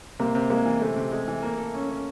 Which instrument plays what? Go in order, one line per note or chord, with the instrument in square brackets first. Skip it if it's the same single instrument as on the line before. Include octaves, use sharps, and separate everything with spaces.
[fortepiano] C3 [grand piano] A#3
[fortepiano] C3
[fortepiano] G#3 [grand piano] A#3
[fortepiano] E3
[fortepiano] C3 [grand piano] A3
[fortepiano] C3
G#3
E3
A#3
A4
C#4
C#4